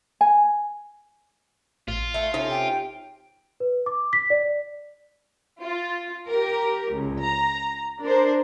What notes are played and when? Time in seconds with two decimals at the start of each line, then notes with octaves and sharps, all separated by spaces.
0.21 G#5
1.88 A1 F4
2.14 A3
2.34 C3 C#4 D#4 A4
2.51 G5
3.60 B4
3.86 D6
4.13 B6
4.30 D5
5.60 F4
6.28 G4 A#4
6.92 C#2
7.22 A#5
8.03 D4 A#4 C5